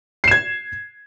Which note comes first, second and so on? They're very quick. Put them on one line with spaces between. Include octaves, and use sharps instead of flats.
C7 E7 G#6